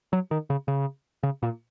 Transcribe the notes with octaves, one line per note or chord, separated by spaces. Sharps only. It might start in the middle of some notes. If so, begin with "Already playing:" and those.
F#3
D#3
C#3
C#3
C#3
A#2